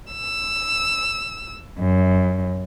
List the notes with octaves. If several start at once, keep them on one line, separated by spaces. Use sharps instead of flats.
E6
F#2